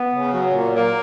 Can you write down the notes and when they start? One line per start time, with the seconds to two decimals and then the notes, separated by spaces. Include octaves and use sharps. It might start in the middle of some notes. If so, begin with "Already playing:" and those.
Already playing: B3
0.12 C#3
0.33 F#3
0.53 A#2
0.75 A#3